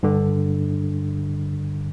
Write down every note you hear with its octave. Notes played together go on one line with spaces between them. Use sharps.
G2 D3